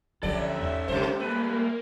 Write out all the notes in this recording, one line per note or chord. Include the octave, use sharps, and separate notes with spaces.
D2 F3 C#4 G4 A4 D5 E5
E2 G#2
C3 G#3 G4 C5
G3 A3 A#3 B4